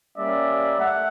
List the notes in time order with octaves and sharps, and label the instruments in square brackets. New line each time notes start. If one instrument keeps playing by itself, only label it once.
[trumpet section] G3 A#3 C#4 D5 E5
A3 E5 F#5